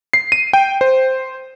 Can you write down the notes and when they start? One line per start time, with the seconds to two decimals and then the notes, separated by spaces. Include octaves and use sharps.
0.13 C7
0.32 D#7
0.53 G5
0.81 C5